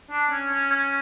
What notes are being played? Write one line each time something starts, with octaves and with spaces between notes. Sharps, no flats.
D4
C#4
C#4
C#4